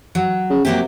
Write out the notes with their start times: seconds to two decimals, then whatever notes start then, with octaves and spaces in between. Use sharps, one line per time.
0.15 F#3
0.50 C#3
0.65 C3 F#3 A#3 G4